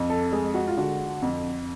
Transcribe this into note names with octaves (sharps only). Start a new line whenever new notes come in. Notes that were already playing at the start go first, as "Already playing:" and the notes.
Already playing: F2
A4
G#3 G#4
F#4
F4
D3 F#4
F2